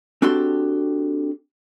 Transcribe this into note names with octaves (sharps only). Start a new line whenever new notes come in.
C4 D4 F#4 G4 A4 C6